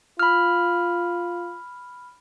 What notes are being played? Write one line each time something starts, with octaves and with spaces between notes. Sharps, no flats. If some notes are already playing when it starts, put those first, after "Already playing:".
F4 B5 F6